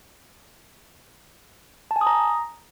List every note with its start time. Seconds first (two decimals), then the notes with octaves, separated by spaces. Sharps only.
1.91 A5
1.96 G#5
2.01 D#6
2.07 A#5